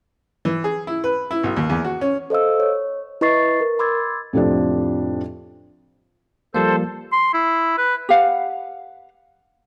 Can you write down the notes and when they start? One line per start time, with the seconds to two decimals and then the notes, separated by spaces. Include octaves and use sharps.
0.45 E3
0.64 G#4
0.87 E4
1.04 B4
1.31 E4
1.44 B1
1.56 D#2
1.70 E2
1.85 F#4
2.01 C#4
2.30 A4 C5 D#5 F5 E6
2.60 C#5
3.21 E4 B4 D#5 C#6 A6 C7
3.61 A#4
3.79 B5 C6 D6 E6 G#6 A6
4.33 F2 A2 C3 F3 D4
6.54 F3 G3 A#3 A4 C5
7.12 C6
7.34 E4
7.78 B4
8.09 G4 B4 F5 F#5